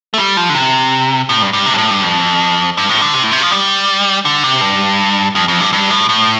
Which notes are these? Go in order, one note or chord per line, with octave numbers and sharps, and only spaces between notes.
A3
G3
F3
D3
C3
A2
G2
G2
C3
G2
A2
G2
F2
G2
A2
D3
C3
A2
C3
F3
G3
D3
C3
G2
F2
F2
G2
G2
A2
A2